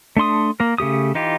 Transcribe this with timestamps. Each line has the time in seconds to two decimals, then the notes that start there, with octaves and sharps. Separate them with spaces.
0.17 A3 D4 C6 D#6
0.60 A#3 A#4
0.78 C#3 A3 G4 D#6
1.15 E3 D#4 F4 G4